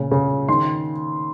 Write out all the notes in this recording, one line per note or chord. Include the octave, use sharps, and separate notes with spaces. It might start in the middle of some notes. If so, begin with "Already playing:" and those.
Already playing: A#2 C#3
C#3
D#3 C6